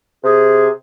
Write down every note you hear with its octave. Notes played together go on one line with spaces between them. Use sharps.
C3 G#4